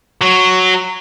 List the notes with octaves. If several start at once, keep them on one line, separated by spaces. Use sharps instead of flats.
F#3